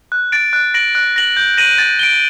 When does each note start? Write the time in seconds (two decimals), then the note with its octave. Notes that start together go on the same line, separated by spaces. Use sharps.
0.12 F#6
0.32 A6 D7
0.53 F#6
0.74 A#6 D7 F#7
0.95 F#6
1.16 A#6 F#7
1.37 G6
1.57 A#6 D#7 F#7
1.78 A6
1.99 D7 G7